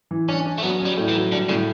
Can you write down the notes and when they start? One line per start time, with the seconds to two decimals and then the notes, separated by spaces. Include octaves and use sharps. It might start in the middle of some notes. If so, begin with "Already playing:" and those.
0.11 E3
0.28 C#4 D4
0.46 D4
0.58 A3
0.63 F#3 B3
0.80 C#4
0.85 G3
0.97 A2
1.09 E3
1.15 F#3
1.32 D3 G3
1.49 A2 C#3